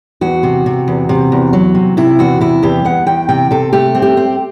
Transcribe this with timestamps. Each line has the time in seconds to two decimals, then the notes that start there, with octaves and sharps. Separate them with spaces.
0.21 E2 F#4
0.43 C3
0.66 C3
0.88 E2
1.09 C3
1.32 E2
1.53 F#3
1.75 C3
1.97 C3 E4
2.19 E2 F#4
2.41 C3 E4
2.63 E2 G4
2.85 E2 F#5
3.06 E2 G5
3.29 C3 G5
3.51 C3 A4
3.73 A3 G4
3.95 C4
4.02 G4
4.17 C4